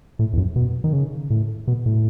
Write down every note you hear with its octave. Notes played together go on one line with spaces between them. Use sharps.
A2
E2
F#2
B2
D#3
C#3
A2
B2
A2